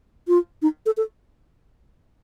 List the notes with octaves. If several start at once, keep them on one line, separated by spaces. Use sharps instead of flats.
F4
D#4
A4
A4